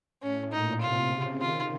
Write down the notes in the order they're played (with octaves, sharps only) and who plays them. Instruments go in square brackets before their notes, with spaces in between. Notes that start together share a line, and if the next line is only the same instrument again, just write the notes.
[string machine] A2 [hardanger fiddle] C#4
[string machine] A#2 [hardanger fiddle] D#4
[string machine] C3 [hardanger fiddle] F4
[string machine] C#3
[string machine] D#3 [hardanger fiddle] F4